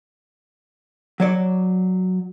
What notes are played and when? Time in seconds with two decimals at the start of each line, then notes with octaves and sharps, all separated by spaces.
1.20 F#3 C#5 D5